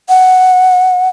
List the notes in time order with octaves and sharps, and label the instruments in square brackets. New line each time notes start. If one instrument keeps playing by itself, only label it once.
[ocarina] F#5